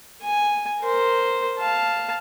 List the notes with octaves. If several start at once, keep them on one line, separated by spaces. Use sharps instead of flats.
G#5
A#4 C5
F5 A5